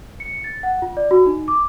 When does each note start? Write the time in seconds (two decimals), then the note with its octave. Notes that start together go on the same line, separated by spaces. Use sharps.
0.20 C#7
0.44 A6
0.63 F#5
0.82 F4
0.97 D5
1.11 F#4
1.26 D#4
1.48 D6